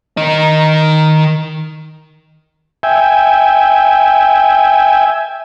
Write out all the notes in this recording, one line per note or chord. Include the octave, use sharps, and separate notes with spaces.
D#3 D#5
E5 G5 G#5